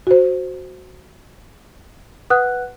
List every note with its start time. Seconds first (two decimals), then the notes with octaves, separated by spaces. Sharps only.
0.07 F#4 C5
2.30 B4 F#5 D#6 F#6